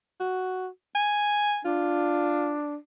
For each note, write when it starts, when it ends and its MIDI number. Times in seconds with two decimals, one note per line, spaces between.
0.20 0.68 66
0.95 1.60 80
1.65 2.76 62
1.65 2.56 65